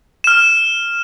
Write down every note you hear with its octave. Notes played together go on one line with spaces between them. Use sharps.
F6 E7